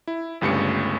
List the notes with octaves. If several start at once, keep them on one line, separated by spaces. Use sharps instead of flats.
E4
G1 C#2 G2 A3 C#4 C#7